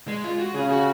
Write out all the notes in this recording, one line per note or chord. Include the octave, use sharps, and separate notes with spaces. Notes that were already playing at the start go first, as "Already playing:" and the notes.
G#3
F4
F#4
C#3 G#4
F#4